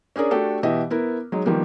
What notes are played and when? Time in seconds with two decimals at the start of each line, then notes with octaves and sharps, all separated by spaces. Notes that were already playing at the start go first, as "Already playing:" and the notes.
0.16 C#4 D4 G#4 A#4 D5
0.31 A3 D4 F#4 G4 A4
0.63 B2 E3 G4 D#5 E5
0.90 B3 E4 A#4
1.32 F#3 G#3 D#4
1.45 D#3 F3 G3 A#3 B3